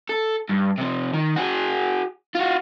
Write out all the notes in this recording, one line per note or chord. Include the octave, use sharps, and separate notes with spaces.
A4
G2
C3 F3
D#3
F#4 G#4
F4 F#4